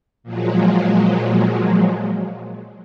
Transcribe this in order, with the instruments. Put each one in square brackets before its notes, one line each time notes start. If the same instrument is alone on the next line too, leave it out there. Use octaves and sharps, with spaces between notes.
[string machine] A#2 F3 F#3 G#3